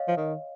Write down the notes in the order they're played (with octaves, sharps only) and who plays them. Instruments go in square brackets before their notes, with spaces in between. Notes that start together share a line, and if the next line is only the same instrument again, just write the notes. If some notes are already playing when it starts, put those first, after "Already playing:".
Already playing: [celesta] C#5 D#5 F5
[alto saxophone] F3
D#3